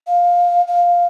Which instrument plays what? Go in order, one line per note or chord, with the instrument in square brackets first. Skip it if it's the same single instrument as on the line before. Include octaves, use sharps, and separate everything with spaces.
[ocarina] F5
F5